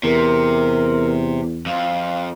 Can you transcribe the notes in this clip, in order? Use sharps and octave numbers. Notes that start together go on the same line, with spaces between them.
E2 C3 A#4
F2 F5